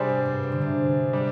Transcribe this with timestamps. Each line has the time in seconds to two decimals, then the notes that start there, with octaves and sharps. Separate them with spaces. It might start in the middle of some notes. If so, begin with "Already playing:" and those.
Already playing: C3 G3 D4 G#4 C5
0.09 G#2
0.26 G2
0.43 G#2
0.52 D3
0.61 C3
1.13 G3 D4